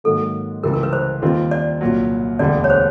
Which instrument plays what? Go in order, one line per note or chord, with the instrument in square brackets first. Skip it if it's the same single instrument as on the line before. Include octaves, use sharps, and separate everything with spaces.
[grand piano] G#2 D#3 F#3 A#3 [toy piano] A4
[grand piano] C#2 C3 E3 G3 [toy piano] A#4
[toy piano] A#4
B4
C5
[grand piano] D#2 D#3 G3 C4 F4
[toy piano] D5
[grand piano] C2 A#2 F#3
[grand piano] E1 D2 D3 G3 [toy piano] D5
[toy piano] C#5
C5